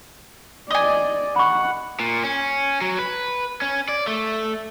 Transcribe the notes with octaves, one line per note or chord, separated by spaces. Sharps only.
D5 D#5 G#5
F#5 B5 C#6
A#2
C#4
F#3
B4
C#4
D5
A3